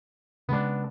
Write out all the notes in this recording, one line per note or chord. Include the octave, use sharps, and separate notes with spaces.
C#3 G#3 B3 D4